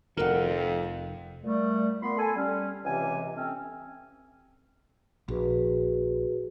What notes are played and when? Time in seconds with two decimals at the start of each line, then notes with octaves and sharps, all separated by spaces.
0.17 F1 B1 F2 D#3 A#4 F#5
1.44 A#2 G3 A3
2.02 A#2 B3 B5 C6
2.18 A4 G#5
2.36 G3 C#4
2.85 C#2 C3 E3 C4 G#5
3.35 A3 C4 C#4
5.28 A#1 F#4 G#4 B4